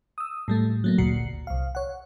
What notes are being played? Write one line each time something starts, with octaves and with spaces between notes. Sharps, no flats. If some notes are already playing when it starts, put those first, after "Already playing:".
D#6 E6
A2 G3 A3
F#3 A3 A#3
G#1 D2 A#2 F#4 C7 C#7
C2 F5
C#5 F#5